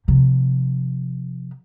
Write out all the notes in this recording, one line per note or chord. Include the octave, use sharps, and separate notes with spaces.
C3 F3